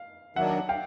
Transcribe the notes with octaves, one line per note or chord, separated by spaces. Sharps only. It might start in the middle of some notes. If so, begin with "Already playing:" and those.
Already playing: F5
D#3 F#3 A#3 D4 E5 F#5
F5 G5